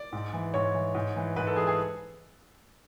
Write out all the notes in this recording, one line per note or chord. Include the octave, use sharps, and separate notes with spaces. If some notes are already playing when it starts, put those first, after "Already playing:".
Already playing: D5
G#2
E3
G#2 C#5
E3
G#2
E3
G#2 B4
A4
E3 G#4
G#4